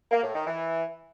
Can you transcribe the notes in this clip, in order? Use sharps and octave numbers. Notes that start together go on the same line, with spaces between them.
A#3
A2
D#3
E3